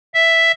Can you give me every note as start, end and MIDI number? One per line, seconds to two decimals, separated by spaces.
0.14 0.52 76